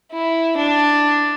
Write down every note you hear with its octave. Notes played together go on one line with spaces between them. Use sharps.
E4
D4